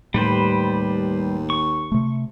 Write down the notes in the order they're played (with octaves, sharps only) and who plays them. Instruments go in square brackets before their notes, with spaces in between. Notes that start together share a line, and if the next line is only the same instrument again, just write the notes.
[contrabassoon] D#2 [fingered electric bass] A2 [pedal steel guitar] G3 B4 C5
[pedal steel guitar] C#6
[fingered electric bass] C3 A3